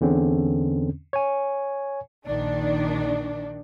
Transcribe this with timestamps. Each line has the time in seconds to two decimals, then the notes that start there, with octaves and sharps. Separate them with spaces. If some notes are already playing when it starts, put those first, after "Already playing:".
0.01 E2 D3 C4 C#4
1.13 C#5 G#5
2.26 A#1 D#3 D4